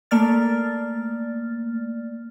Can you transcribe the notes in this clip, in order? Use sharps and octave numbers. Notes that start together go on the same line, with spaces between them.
A3 A#3 D5 F6 A6